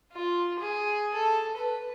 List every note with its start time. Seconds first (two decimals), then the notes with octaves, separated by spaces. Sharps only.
0.13 F4
0.60 G#4
1.14 A4
1.57 B4